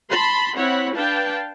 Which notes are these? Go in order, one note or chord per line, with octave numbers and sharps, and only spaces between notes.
A5 B5 C6
C4 E4 C#5 F#5 B5
D4 B4 F5 G5 A5